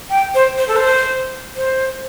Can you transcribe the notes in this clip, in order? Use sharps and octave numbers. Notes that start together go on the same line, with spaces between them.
G5
C5
C5
A4
C5
C5